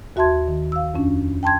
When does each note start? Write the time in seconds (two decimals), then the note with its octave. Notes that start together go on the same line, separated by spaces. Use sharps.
0.16 D#2 F#4 E5 A5 C6 G#6
0.48 D#3
0.72 F5 E6
0.95 F2 C#4 D4
1.43 G5 A5 C6 G#6